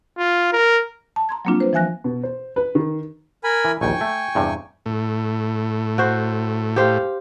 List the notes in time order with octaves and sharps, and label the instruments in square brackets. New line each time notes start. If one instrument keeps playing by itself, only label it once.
[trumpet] F4
A#4
[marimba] A5
A#5 C6 G#6
F#3 G3 A#3 C4 D4 F4
B4 C5
E3 F3 E5 G#5 F#6 A#6
[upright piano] B2
C5
B4
D#3
[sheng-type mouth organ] A#4 G#5 B5
[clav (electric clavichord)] E3
[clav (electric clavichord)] A#1 D#2 [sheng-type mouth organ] G5 G#5 C#6
[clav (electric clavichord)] A3
E2 G2 C3
[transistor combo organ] A2
[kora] F#4 C5
G4 C5 F5